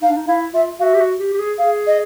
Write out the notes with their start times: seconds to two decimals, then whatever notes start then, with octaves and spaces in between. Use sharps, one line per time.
0.02 D#4 F5
0.09 D4
0.17 D#4
0.28 E4 F5
0.54 F4 E5
0.80 F#4 E5 F5
0.94 G4
1.00 F#4
1.19 G4
1.33 G4
1.39 G#4
1.58 G#4 F5
1.87 D#5